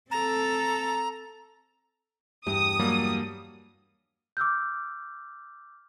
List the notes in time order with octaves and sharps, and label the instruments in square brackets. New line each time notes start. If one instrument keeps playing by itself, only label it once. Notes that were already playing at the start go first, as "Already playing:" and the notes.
[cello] C4 A4 [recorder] A#5
[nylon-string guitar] E2 G2 G4 [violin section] D#6
[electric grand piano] F#3 G3 A#3
[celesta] D6 E6 F6 G6